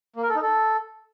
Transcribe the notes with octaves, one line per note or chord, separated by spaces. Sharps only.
A#3
A#4
A4
D#4
A4